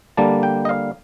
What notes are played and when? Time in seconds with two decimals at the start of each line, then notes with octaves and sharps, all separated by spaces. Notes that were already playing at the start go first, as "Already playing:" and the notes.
0.17 D3 G3 A#3 A5
0.43 G5
0.65 D#5
0.69 F5